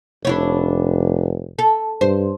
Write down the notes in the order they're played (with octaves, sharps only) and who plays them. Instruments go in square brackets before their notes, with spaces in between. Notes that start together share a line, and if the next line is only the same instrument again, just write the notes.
[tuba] F1 [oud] D4 E4 C#5
[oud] A4
[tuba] G2 [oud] C5